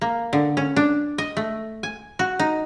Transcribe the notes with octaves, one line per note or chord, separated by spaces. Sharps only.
A#3
D3
C#4
D4
D#5
A3
G#5
F#4
D#4